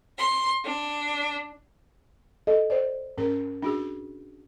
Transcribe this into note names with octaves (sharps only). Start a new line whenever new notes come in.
C6
D4
A4 D#5
C5 D5
G#2 C#4 A#4
D4 F#4 G#4